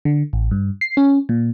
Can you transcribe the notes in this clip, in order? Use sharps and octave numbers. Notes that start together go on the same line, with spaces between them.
D3
A1
G2
C7
C#4
A#2